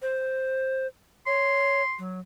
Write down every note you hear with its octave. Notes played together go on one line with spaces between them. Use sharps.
C5
C#5 C6
F#3